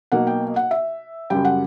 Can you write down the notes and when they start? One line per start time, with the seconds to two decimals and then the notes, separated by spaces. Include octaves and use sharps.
0.12 B1 B2 A#3 F#5
0.27 G5
0.56 F#5
0.71 E5
1.30 F#2 C#3 G3 G5
1.45 F#5